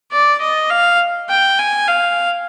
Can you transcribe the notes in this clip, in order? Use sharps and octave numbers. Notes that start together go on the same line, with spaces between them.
D5
D#5
F5
G5
G#5
F5